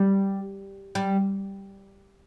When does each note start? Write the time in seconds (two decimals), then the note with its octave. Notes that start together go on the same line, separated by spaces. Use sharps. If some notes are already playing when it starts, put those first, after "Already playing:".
Already playing: G3
0.95 G3